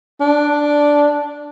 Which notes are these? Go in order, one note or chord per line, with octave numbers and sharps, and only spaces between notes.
D4